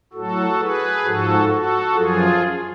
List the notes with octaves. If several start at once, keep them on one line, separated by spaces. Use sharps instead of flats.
A2 F#3 F#4 A4
G#4 B4
G#2 F3 F#4 A4
F#4 A4
F#2 F3 F4 G#4